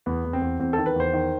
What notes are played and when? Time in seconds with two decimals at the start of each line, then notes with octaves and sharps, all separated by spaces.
0.06 E2 B3
0.25 E2
0.33 C4
0.42 E2
0.59 E2 C4
0.73 D#3 A4
0.86 B4
0.96 E2 C5
1.13 D#3